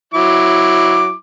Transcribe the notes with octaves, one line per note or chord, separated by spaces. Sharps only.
F#3 E4 D6